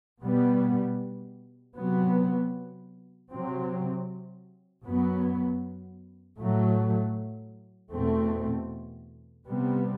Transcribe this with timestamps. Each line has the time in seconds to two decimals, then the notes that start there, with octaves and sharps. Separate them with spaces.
0.22 B2 G3 B3
1.76 C3 F#3 B3
3.30 C3 F#3 C4
4.84 F#2 F#3 B3
6.37 A2 F#3 A3
7.92 E2 B2 A3 C4
9.46 C3 G3 B3